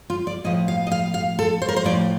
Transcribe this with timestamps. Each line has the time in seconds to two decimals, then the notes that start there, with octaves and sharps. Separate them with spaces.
0.10 F4
0.27 D5
0.44 A2 F3 D#5
0.68 F5
0.87 D#5
0.91 F5
1.14 F5
1.39 A4
1.62 C5
1.69 A#4
1.76 C5
1.84 A2 F3 D5